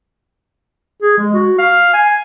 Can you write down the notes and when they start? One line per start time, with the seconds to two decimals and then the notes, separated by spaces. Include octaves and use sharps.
1.02 G#4
1.17 G#3
1.34 F#4
1.59 F5
1.93 G#5